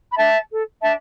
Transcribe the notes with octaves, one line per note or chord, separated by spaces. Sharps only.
B5
D4 E5 A5
A4
D4 E5 A5